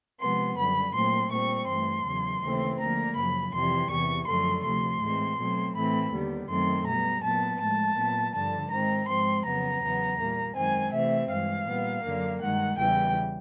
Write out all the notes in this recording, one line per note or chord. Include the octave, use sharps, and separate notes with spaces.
C3 F3 G#3 B3 C6
F#2 D3 G3 B5
A#2 F#3 A3 C4 C6
A#2 G3 C4 C#6
G2 E3 A3 C6
E2 C#3 F#3
D#2 C#3 E3 A3 C4
D2 D3 F3 A#3 A#5
F#2 C#3 F3 B5
F2 C3 E3 G3 C6
E2 C3 E3 C#6
F#2 D3 F3 A3 C6
D2 C3 F3 C6
A2 E3 G#3 C4
B2 F#3 A3 C4
A2 E3 A3 C4 B5
D#2 D3 G3 B3
F#2 D#3 F#3 A3 C4 C6
B2 G3 B3 A#5
A#2 F#3 B3 A5
A2 F3 G#3 A5
A#2 F#3 B3
G2 D3 F3 A5
G#2 D#3 G#3 C4 A#5
G#2 F3 G#3 C4 C6
F2 C#3 F#3 B3 A#5
E2 C#3 F#3 B3
A#2 G3 A#3
F#2 D#3 G#3 C4 G#5
C3 E3 A3 C4 E5
G2 E3 G#3 F5
A#2 G3 B3
F#2 D3 F#3 A#3
G2 D#3 G#3 F#5
E2 C#3 E3 G3 G5